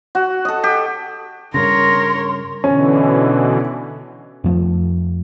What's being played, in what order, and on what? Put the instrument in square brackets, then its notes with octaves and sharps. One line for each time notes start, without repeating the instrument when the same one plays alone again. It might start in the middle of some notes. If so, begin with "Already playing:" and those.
[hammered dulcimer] F#4
A4 D#5
G4
[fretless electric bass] G2 C#3 [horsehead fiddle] A#4 C#5 [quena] C6 [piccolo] A#6
[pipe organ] B2 D3 E3 [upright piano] C#4
[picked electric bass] F2 F3 A3